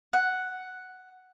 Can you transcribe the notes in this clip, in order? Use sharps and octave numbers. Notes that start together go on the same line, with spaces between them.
F#5